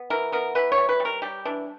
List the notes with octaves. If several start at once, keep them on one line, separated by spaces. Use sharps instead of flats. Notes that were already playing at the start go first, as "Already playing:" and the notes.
Already playing: B3
E3 A#4
B3 A#4
E3 B4
C#5
G3
B4
G3
A#4
G3 G4
E3 D4